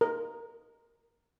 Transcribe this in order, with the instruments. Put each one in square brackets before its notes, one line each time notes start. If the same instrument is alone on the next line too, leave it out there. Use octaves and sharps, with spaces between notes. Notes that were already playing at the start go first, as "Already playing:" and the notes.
[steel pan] A#4